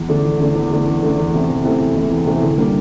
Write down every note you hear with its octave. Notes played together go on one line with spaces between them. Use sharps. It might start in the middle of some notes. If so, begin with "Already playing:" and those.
Already playing: E2
D3 A3 D4
E2
D3 A3 D4
E2
D3 A3 D4
E2
D3 A3 D4
E2
C3 E3 A3
E2
C3 E3 A3
E2
C3 E3 A3
E2
C3 E3 A3
D3
G3 A#3 D4